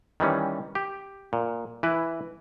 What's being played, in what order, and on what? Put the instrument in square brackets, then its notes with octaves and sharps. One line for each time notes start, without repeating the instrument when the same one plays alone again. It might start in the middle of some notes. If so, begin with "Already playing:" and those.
[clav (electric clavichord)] D#3 E3 G3 C#4
G4
A#2
E3 E4 B4